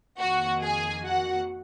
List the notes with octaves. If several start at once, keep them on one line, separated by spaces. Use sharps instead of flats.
F2 D#3 A#3 F#4 F#5
G#4 G#5
F#4 F#5